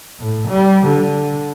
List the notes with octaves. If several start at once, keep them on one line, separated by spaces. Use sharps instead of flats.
A2
G3
D3